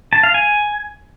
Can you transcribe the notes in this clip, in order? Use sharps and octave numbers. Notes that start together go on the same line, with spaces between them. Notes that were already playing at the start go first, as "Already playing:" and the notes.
A5
F5
G#5